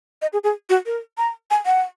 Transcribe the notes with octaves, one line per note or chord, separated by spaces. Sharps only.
D#5
G#4
G#4
F#4
A#4
A#5
G#5
F#5